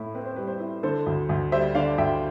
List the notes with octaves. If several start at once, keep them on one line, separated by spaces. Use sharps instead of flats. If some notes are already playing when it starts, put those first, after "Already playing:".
Already playing: A2 E4
C4 B4
C5
G3 B4
C5
E4 B4
D3 A4 C5
D2
D2
G3 C5 E5
D3 D5 F5
D2 E5 G5